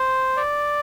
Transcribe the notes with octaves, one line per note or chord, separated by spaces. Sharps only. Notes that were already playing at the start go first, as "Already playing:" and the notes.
Already playing: C5
D5